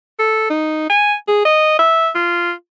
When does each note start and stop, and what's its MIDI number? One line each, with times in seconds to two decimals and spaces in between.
0.19 0.47 69
0.50 0.88 63
0.90 1.14 80
1.28 1.42 68
1.45 1.78 75
1.79 2.09 76
2.15 2.52 65